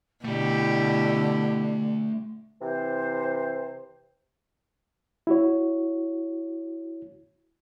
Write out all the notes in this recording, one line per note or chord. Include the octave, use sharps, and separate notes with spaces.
B2 D3 A3 E4 G4 D5
C3 E3 C5
E4 F#4 C#5